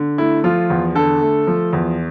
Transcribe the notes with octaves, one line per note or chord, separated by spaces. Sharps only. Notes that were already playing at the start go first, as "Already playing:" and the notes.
Already playing: D3
A3 E4
F3 F4
E2
D3 A4
A3
F3
E2